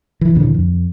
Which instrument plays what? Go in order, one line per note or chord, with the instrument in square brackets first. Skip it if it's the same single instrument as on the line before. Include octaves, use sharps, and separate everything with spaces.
[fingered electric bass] E3
D#2 A#2 D3 E3
F2